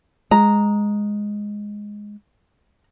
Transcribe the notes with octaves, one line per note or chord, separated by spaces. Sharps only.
G#3 A#5